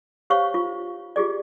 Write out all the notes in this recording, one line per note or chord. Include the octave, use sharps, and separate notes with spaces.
G4 C5 C#5 F5 C#6
F4
F4 G4 G#4 D5